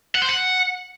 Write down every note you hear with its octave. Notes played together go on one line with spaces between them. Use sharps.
F#5
C5
F#5